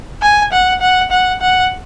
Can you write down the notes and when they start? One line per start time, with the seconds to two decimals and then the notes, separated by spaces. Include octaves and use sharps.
0.22 G#5
0.52 F#5
0.81 F#5
1.11 F#5
1.41 F#5